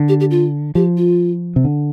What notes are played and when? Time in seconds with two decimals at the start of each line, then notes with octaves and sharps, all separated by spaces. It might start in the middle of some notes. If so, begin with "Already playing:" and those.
Already playing: D3
0.09 G4
0.20 G4
0.31 F4
0.75 F3 G4
0.97 F4
1.56 C3
1.64 D3